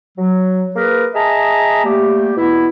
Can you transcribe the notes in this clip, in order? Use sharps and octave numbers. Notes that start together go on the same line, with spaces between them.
F#3
A#3 G#4 A#4 B4
G#4 D#5 E5 A5 A#5
G3 A3 A#3 G4
B2 B3 E4